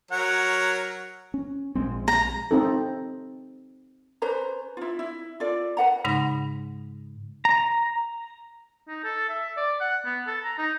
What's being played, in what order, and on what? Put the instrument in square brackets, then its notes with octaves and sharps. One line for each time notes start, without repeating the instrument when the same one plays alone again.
[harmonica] F#3 A#4 C#5 [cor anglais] F#5
[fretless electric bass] C#4
A#1 G#3 C4
[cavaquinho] A#5
[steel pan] C4 D#4 A4
[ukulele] C#4 B4 C5 A#5
E4 F4
E4
F4 A4 D5
B4 F#5 A#5
[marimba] G#2 C#3 G#3 D#4 B5 A#6
[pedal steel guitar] A#5
[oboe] D#4
A4
E5
D5
F#5
B3
A4
A#5
D#4